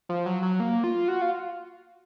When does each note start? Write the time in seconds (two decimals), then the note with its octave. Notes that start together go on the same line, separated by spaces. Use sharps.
0.09 F3
0.26 F#3
0.43 F#3
0.60 A#3
0.84 F4
1.08 F#4
1.22 F4